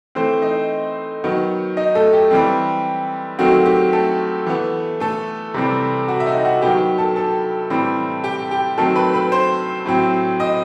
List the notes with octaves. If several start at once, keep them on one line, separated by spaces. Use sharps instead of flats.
E3 A3 C4 C5
D#4 D#5
D#3 F#3 B3
D#4 D#5
A3 A4
G4
E3 G3 C4
D#3 F#3 A3 C4 F#4
G4
A3 A4
E3 B3
A3 A4
C3 E3 G3 C4
F#4
E5
D#4 D#5
F#4 F#5
D#3 F#3 B3 G4 G5
A4 A5
A4 A5
A2 E3 G3 C4
G4 G5
G4 G5
D#3 F#3 A3 C4 A4 A5
B4 B5
B4 B5
C5 C6
A2 F#3 C4
D#5 D#6